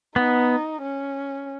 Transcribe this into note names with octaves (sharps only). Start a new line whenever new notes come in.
B3 D#4
C#4